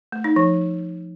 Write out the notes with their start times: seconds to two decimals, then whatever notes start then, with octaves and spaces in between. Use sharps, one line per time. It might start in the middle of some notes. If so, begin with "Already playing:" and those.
0.12 A3
0.24 D#4
0.36 F3